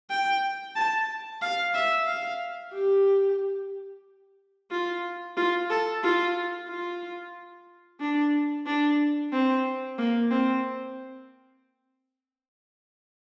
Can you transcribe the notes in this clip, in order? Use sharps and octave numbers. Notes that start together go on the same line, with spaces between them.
G5
A5
F5
E5
F5
G4
F4
F4
A4
F4
F4
D4
D4
C4
A#3
C4